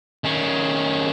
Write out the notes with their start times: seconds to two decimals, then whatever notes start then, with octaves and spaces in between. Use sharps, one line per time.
0.24 D#3 C#4